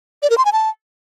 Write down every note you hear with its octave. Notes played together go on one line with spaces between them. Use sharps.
D5
A#4
C6
G#5
A5